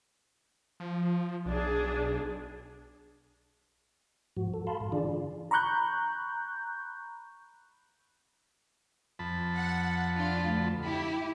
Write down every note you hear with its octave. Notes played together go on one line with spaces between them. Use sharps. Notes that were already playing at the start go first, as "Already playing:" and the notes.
F3
B1 D4 G#4
G#2 F3 F#4
A4
F5 A5 B5 C6
G#2
D3 E3 D4 F4 G#4 D5
A#5 B5 C#6 F#6 G6
F2 A5 B5
F#5
D4 F4
D2
E4 G4 B5